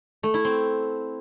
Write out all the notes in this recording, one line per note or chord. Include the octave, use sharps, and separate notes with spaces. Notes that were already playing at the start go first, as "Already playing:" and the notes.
A3
E4
C4